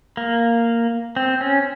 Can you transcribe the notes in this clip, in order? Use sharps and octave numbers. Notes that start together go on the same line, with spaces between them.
A#3
C4
C#4